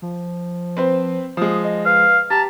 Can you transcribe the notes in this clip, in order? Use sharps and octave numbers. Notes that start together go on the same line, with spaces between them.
F3
C4 B4 C5
F3 G#3 D#6
D#5
B4 F5
G4 A5 A#5